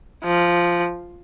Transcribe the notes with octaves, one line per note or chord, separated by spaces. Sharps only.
F3